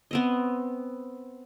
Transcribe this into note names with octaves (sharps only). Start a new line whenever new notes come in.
B3 C4 D#5